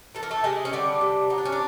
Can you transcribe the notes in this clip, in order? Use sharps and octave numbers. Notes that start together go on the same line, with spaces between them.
E3 A4
A#4
A3 A4
C3 G#3 G#4
C#4
D3 G3 D4
C3
F#3 D#4
D4
C#4
D4